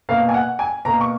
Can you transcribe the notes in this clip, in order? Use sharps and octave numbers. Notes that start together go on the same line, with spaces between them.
B2 A#3 F5
G#5
F#5
G#5
B2 A#3 A#5
C#6